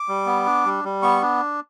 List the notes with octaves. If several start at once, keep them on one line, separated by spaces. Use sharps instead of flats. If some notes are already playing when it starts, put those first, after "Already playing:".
Already playing: D6
G3
B3
D4
G3
G3
B3 C#6
D4